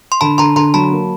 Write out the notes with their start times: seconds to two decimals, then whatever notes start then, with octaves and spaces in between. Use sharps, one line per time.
0.12 C6
0.21 D3 A5 B5
0.38 D3 A#5 C6
0.56 D3 A#5 C6
0.74 F#3 A5 B5
0.91 A#3